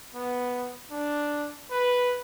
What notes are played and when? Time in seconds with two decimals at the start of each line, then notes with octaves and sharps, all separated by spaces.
0.15 B3
0.91 D4
1.71 B4